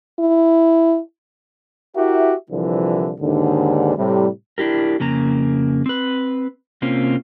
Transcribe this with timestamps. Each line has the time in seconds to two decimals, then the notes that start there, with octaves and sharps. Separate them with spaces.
0.19 E4
1.96 E4 F#4 G4 A#4 E5
2.50 C2 D3 E3 F3
3.19 D#2 G#2 D3
3.97 A2 C3 G3
4.58 D4 E4 G4 A#4
5.00 F2 C#3 A#3 A#5
5.86 C4 B4
6.82 C3 A#3 C4 C#4 F4